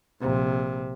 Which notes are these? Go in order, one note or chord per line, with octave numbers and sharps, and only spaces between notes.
A#1 C3